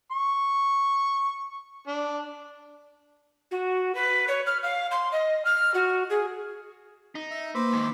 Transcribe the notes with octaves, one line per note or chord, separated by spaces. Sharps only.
C#6
D4
F#4
B4
C#5
F6
F5
C6
D#5
F6
F#4
G#4
D#4
E5
A#3 B4 C5 D6 E6
G#2 D#3